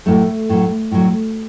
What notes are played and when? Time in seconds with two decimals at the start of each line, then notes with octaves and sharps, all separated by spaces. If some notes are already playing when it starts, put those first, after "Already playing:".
0.06 A2 F#3 A3
0.49 A2 F#3
0.91 A2 F#3